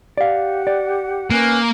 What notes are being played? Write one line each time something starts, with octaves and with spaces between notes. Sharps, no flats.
G4 D5 F5 F#5
D5
A#3 C#4 B4 F#6